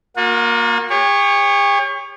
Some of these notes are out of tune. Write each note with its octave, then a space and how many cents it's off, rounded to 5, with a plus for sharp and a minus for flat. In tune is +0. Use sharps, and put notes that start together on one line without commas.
A#3 +5 F#4 -45
G4 +45 C#5 +0